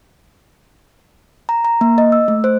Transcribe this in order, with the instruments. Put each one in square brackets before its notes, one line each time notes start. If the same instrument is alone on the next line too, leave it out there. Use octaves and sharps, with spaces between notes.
[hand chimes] A#5
A#5
A#3
D#5
E6
A3
C5